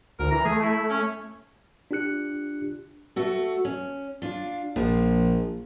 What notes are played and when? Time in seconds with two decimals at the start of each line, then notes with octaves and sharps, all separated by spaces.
0.19 D2 A#4
0.31 E3 A#5
0.45 A3 G#4
0.61 E4
0.90 C#4
1.91 D4 F4 G4 F#6 C#7
3.16 A3 F#4 A4
3.65 C#4
4.22 D4 F4
4.76 A#1 F3